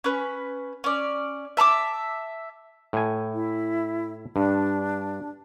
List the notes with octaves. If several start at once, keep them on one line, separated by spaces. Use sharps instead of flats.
C#4 B4
C#4 D5
E5 A5 A#5 D6
A2 G#5
E4
G2 D4